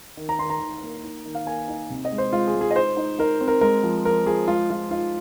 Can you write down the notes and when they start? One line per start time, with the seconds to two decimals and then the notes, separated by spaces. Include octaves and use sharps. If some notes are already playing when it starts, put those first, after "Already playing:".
0.17 D#3
0.29 A#5
0.39 D#3 C6
0.50 A#5
0.60 D#3
0.83 A#3
1.04 D#4
1.25 D#3
1.35 F5
1.46 A#3 G#5
1.68 D#4
1.90 C3
2.05 D#5
2.12 G#3
2.18 C5
2.33 G#3 F4
2.48 G#4
2.55 G#3
2.61 G#4
2.71 D#5
2.76 D#4 C5
2.97 D#4
3.19 D#4 A#4
3.41 C4
3.48 A#4
3.61 G#3 A#4
3.83 F3
4.05 F3 A#4
4.27 F3 G#4
4.48 G#3 F4
4.70 G#3 F4
4.91 D#4 F4